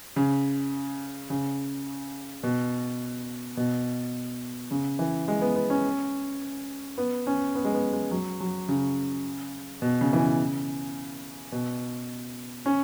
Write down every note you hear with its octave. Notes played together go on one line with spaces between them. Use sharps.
C#3
C#3
B2
B2
C#3
E3
G#3
B3
B3
C#4
B3
C#4
B3
G#3
B3
G#3
F#3
F#3
C#3
B2
C#3
E3
C#3
B2
C#4